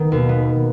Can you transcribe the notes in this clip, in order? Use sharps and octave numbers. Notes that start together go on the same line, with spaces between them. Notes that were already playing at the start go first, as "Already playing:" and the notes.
Already playing: D#3 B3
D#2 B2
B3